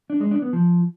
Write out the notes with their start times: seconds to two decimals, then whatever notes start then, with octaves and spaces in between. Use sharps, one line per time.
0.10 D4
0.20 G#3
0.31 D4
0.42 B3
0.53 F3